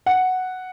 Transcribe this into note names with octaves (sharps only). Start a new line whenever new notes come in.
F#5